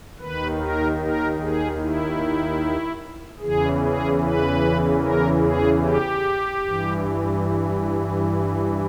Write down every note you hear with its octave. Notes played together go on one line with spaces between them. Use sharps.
D#2 D#3 B4
A#4
A#4
G#4
E4
E2 C#3 E3 G#4
G#4
B4
A#4
G#4
G4
G2 E3